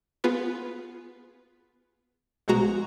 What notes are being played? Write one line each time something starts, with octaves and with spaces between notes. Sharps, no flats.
B3 F4 G#4 B4
A#1 B2 G#3 F#4 A#5